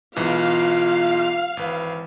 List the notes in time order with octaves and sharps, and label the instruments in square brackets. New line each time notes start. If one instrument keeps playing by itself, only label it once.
[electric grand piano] B1 G#2 E3 [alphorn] F4 [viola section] F5
[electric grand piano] G#1 B4 [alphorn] E3